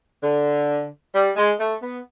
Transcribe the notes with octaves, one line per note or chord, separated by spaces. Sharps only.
D3
G3
G#3
A3
B3